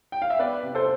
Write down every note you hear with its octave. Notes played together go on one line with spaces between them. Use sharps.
G5
F5
E5
B3 B4 D5
C3
A4 C5